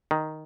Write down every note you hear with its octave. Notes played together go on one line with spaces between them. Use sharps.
D#3